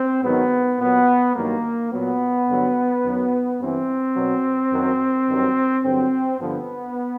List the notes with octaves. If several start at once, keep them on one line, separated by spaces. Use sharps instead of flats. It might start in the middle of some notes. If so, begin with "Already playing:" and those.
Already playing: C4
G#2 D#3 F#3 B3
A#2 F#3 B3
G2 D#3 F#3 A#3
A#2 F#3 B3
G2 D3 F#3
F#2 D#3 F#3
G2 E3 C4
B2 F#3
F#2 D#3 F#3
G2 D#3 F#3
G2 D3 F#3 C4
G2 D3 F3 B3